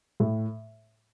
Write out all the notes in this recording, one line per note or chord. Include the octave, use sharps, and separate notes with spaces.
A2